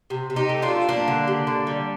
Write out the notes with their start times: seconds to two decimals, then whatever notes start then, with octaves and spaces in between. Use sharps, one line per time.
0.10 C3
0.30 C3
0.36 D#4 G4
0.49 A3
0.62 D4 F4
0.69 F3
0.88 G3 A#3 D4
1.08 D3
1.28 G3
1.47 D3
1.67 G3